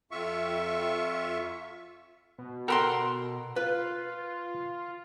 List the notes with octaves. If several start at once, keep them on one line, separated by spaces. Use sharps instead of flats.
F2 F4 E5 C#6
B2
A4 A#4 F#5 G5 B5 C6
F4 B4